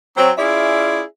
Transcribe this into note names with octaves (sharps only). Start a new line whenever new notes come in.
F#3 C4
C#4 E4 F4 G#4 D5 E5